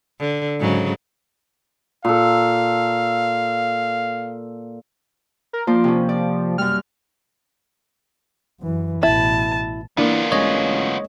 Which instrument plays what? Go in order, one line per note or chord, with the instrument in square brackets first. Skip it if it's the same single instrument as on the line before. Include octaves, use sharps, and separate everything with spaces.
[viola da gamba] D3
G#2 C#3 F#3
[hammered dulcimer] A#2 A4 [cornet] F5
[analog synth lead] A#4
[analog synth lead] F3 [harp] A#3 C5 D5
[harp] C3 C#4
D5
[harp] F#2 G3 [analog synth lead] F6
[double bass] F#2 E3
[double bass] A1 B2 [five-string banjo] E4 [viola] A5
[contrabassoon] E3 [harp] A#3 D4 D5 [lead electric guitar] B3 F4
[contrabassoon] A1 [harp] G#3 [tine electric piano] C#5 D#5